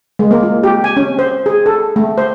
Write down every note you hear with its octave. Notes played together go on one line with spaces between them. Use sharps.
G#3
A#3
F4
G4
G#5
C#4
C5
G#4
A4
A3
C5